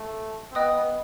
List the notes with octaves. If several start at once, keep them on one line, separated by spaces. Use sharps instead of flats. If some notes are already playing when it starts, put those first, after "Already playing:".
Already playing: A3
C4
B3 D#5 G5 D#6 F#6
B3